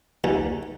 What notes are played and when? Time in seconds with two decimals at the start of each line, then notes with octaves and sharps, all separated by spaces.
0.24 D#2